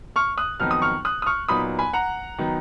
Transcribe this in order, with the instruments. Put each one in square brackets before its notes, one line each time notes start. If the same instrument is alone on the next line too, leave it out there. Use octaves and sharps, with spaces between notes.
[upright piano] C#6 F6
D#6 F#6
F2 D#3 F#3 B3 D#4 F6
D#6
C#6 F6
D#6 F#6
D#6
C#6 F6
A#2 F#3 B3 D#4 B5 D#6
G#5 B5
F#5 A#5
D#3 F#3 B3 D#4